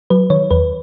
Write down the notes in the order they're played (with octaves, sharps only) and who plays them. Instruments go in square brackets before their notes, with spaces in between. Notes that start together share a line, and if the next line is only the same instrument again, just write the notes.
[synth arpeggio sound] F#3 B4
D#3 C#5
E2 B4